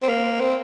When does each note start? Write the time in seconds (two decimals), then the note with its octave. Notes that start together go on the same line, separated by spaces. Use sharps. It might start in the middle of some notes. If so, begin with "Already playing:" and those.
0.02 C4
0.09 A#3
0.40 C4